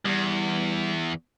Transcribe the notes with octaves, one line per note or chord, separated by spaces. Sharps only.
E2 G3